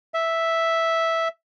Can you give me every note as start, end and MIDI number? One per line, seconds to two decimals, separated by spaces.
0.14 1.28 76